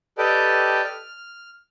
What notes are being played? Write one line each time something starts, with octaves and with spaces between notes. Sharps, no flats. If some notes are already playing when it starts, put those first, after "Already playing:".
G4 A4 B4 D5 D#5 G5
F6